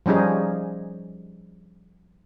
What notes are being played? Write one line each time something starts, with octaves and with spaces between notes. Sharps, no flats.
F3 G3 C#4 D#4 G#4